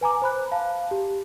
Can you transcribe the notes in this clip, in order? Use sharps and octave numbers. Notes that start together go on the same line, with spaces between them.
B4 G#5 A#5 D6
C5 B5 F#6
F5 A5
G4